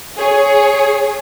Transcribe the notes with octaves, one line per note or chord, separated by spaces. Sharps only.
G#4 C#5